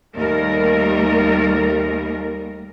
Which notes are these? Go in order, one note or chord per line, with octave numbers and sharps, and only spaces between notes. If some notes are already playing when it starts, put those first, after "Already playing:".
D#2 G3 A3 A#4